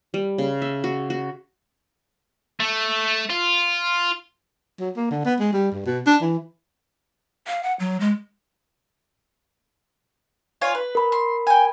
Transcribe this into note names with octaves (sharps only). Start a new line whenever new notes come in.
G3
C#3
E5
F#4
F#4
A3
F4
F#3
A#3
D3
B3
G#3
G3
G2
B2
D4
E3
F5
F#5
F#3
G#3
F4 C#5 G#5
B4
A#4 B5
C6
G5 G#5